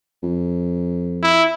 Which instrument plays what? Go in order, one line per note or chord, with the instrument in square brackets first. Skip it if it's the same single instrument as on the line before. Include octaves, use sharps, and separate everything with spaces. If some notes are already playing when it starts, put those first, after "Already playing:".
[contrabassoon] F2
[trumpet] E4